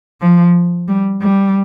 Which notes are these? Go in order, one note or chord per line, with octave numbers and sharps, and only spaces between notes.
F3
G3
G3